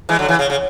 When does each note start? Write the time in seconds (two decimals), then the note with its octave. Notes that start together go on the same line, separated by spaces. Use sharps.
0.09 E3 G#3
0.19 D3 F#3
0.28 C#3 E3
0.39 C#3
0.50 C#3